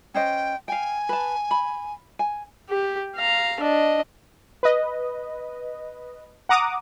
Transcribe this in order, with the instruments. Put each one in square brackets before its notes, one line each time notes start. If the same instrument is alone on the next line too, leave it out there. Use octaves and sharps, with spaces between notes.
[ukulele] C#4 C5 D#5 [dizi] G5
[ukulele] F5 G5 [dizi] G#5
[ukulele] B4 A5
B5
G#5
[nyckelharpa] G4
F5 A#5
D4 D#5
[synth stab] B4 D#5
F#5 A#5 D6 D#6